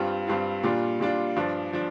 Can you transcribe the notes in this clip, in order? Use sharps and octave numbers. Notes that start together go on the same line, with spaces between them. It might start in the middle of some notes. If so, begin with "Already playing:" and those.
Already playing: G2 G3 C4 F4
G2 G3 C4 F4
A#2 G3 D4 F4
A#2 G3 D4 F4
G2 F3 D4
F3 D4